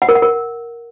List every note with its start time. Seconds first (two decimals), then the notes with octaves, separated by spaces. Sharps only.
0.02 F#5
0.09 A#4
0.15 F#5
0.22 A#4